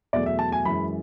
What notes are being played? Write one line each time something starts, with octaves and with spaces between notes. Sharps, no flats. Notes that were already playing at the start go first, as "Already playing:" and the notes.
E2 B2 F#3 A3 D5
E5
A5
G#5
F#2 E3 G#3 B5